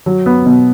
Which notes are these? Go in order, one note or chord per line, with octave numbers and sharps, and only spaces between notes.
F#3
B3
B2